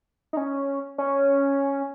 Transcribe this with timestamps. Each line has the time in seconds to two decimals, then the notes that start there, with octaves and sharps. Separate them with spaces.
0.33 D#4
0.37 C#4
0.98 C#4